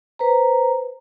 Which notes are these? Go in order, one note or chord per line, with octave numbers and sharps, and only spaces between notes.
B4 C5 A#5